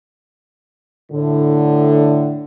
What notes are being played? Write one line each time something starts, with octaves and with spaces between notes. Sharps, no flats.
A2 D3